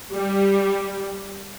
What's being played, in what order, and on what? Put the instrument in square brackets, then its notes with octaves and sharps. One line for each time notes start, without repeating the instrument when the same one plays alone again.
[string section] G3